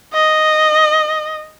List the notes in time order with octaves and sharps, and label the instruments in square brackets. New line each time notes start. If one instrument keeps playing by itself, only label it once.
[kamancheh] D#5